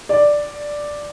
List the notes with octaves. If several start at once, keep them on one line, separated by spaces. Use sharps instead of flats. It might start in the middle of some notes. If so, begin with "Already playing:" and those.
D5